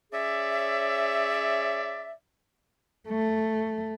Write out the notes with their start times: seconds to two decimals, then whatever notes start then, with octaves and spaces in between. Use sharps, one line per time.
0.12 C#4 G#4 C#5 D5 E5
3.09 A3